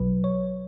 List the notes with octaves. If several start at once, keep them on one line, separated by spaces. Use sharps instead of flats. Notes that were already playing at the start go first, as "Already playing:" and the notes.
Already playing: B1 B2 F#3 B4
C#5